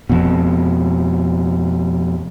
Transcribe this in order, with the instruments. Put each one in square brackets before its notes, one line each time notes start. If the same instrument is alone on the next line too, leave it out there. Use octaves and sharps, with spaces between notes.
[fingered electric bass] F2 B2